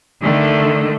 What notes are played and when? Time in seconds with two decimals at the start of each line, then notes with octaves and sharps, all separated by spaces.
0.21 D3 D#3 A3